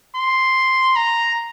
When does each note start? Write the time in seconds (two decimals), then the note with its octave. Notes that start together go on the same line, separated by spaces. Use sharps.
0.17 C6
0.96 A#5